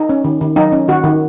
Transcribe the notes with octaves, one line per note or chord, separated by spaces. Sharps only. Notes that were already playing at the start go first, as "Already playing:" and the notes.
Already playing: D#4
C#4
D#3
D#3
F#3 D#4
C#4
D#3 F#4
D#3